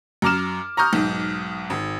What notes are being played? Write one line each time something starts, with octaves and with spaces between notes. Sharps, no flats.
F#2 A#5 D6 F6 E7
A#5 C#6 D#6 F6 G6
B1 G#2
G#1